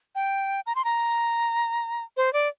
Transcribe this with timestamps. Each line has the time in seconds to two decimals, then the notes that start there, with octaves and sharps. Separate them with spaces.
0.15 G5
0.66 A#5
0.75 C6
0.85 A#5
2.17 C5
2.33 D5